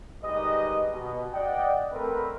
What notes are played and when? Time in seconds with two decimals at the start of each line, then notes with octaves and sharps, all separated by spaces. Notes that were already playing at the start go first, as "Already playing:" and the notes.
0.23 D#3 G3 G#3 G4 B4 D#5
0.92 B2
1.33 D5 D#5 F#5 G5
1.92 A3 C4 A#4 B4